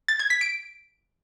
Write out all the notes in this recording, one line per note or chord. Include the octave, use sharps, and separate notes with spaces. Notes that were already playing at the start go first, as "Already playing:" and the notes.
A6
G#6
B6
D7